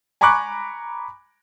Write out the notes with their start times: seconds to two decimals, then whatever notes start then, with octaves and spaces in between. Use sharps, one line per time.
0.21 G#5 A#5 B5 C#6 D6 F#6